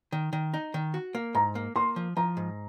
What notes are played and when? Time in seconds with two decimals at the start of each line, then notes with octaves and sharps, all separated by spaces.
0.12 D#3
0.33 D#3
0.54 D#4
0.74 D#3
0.94 F#4
1.15 A#3
1.35 G#2 A#5
1.55 A#3
1.76 A#3 C6
1.96 F3
2.17 F3 A#5
2.37 G#2